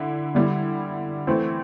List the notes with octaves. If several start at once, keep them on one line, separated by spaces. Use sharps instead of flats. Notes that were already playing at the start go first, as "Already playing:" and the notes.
Already playing: D3 E4
D3 G3 E4
E3 A3 C4 E4